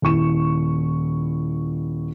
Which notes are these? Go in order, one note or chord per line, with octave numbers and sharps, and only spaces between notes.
D#1 E4 C#6 E7